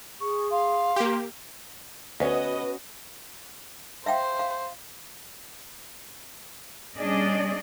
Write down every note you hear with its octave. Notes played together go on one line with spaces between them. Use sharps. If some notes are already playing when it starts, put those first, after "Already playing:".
G#4 C#6
F5 C6
A#3 G4
D2 B3 C#4 F#4 B4 D#5
C5 E5 F5 G5
F5
G3 C#4 D4 G#4 D5 D#5